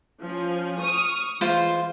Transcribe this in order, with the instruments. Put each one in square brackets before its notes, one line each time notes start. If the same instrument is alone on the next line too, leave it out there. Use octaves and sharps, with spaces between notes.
[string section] F3 C#4
C#6 D#6 F6
[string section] E3 G#3 [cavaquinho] F4 C5